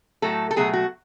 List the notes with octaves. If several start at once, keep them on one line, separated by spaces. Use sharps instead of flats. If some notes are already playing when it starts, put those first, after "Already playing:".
A2 F#3 A3 A4
A4
B2 F#3 A3 G#4
F#4